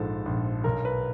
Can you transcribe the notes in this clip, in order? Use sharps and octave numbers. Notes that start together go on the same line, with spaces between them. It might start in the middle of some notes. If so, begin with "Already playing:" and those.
Already playing: A#1 G#2 F3 A4
A#1
B1 A#4
B4